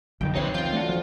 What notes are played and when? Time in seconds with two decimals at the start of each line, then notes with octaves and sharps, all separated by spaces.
0.21 A#1 F2 D3 D#3 F#3 G5
0.35 C#2 C3 A3 C4 D#4 B4 C#5 C6
0.54 E3 F4 G5 G6
0.73 A3 D4 F#4
0.89 F3